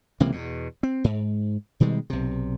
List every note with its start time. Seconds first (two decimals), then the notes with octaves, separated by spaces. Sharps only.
0.20 C#2 C3 E3 A#3
0.32 E2 B2
0.83 C4
1.04 G#2
1.80 B2 D#3 G3 G#3
2.10 B1 C3